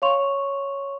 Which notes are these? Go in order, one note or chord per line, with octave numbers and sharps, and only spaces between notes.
C#5 F5 C6 C#6 F7